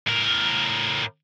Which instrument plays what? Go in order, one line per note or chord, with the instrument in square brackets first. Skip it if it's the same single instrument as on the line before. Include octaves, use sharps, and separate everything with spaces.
[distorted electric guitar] A2 A#4